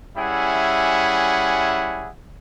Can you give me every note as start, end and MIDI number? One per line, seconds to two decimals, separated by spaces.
0.17 2.09 55
0.17 2.09 61
0.17 2.09 64
0.17 2.09 68
0.17 2.09 76
0.17 2.09 78